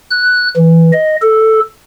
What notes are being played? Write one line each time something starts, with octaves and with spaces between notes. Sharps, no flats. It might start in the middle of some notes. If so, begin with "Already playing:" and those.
F#6
E3
D#5
A4